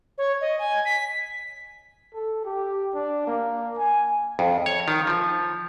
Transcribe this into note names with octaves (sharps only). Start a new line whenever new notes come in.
C#5
D#5
G#5
B6
A4
G4
D4
A#3
G#5
F2
C#5
D#3
F3